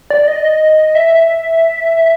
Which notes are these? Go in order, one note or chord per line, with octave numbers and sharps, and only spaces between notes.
D5
D#5
E5